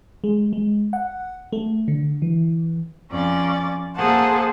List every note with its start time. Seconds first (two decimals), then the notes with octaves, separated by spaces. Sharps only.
0.24 G#3
0.53 G#3
0.93 F#5
1.52 A3
1.88 D3
2.22 E3
3.11 F2 C#4 D5 A6
3.95 A#3 G#4 A4 C5 F#5 A5